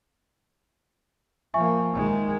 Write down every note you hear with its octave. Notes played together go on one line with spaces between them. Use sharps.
F3 A#3 E5 G#5 C#6
D#3 G#3